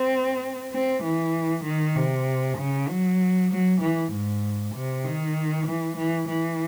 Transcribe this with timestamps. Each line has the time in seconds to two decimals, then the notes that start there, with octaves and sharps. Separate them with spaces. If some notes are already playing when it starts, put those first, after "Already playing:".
Already playing: C4
0.72 C4
1.03 E3
1.64 D#3
1.96 C3
2.58 C#3
2.89 F#3
3.51 F#3
3.81 E3
4.12 G#2
4.74 C3
5.04 D#3
5.66 E3
5.97 E3
6.28 E3